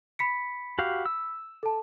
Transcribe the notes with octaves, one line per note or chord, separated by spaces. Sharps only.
B5 B6 C#7
F#4 G4 F5
E6
A4 A5